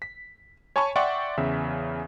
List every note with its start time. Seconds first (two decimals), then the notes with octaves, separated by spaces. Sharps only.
0.02 B6
0.76 C#5 G#5 A5 B5 C#6
0.96 D5 E5 F#5 G5 C6 C#6
1.37 E2 C#3 E5